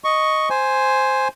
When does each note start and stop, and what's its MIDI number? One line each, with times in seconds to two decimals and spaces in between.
0.04 0.49 75
0.04 0.49 85
0.50 1.28 72
0.50 1.28 80